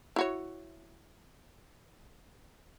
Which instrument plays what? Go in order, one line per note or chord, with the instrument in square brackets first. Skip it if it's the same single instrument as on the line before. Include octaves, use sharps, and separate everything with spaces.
[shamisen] E4 F#4 C#5